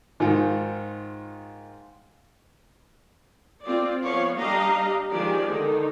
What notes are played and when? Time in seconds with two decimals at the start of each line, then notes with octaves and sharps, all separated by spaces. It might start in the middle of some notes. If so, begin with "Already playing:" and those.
0.20 G#2 D#3 F4
3.63 C4 F4 D5
4.03 F3 B3 C#5 F5
4.37 G3 D4 G4 D#5 F5 A#5
5.12 D#3 F3 G#3 G4 D5 G#5
5.47 D3 D#3 D#4